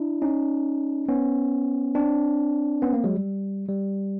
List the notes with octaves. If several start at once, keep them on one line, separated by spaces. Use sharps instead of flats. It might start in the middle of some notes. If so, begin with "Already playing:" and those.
Already playing: D4 E4
C#4 D#4
B3 C#4
C4 D4
B3 C#4
A#3 C4
F#3 G#3
G3
G3